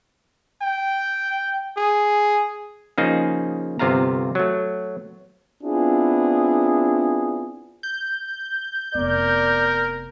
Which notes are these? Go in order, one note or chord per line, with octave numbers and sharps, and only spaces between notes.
G5
G#4
C#3 F3 A#3 D#4 G#4
G1 C3 F4 F5 A#5
F#3 A3
B3 C4 D4 E4 F4 G#4
G6
F1 B3 A#4 D5